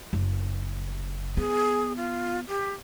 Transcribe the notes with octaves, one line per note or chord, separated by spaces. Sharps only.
F#1
B3 G#4
F4
G4